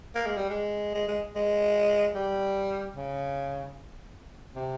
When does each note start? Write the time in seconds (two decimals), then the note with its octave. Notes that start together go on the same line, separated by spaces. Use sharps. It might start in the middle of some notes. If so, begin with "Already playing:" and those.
0.15 A#3
0.26 G#3
0.37 G3
0.49 G#3
0.94 G#3
1.08 G#3
1.35 G#3
2.15 G3
2.95 C#3
4.55 C3